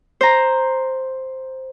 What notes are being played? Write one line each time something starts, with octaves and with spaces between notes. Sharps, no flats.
C5 A#5